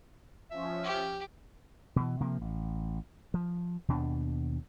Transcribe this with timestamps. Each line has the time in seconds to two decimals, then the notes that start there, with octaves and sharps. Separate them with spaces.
0.51 F3 C#4 E5
0.84 G4
1.96 B2 E3
2.20 C3 F3 A#3
2.41 A1
3.34 F3
3.88 D#2 B2 D4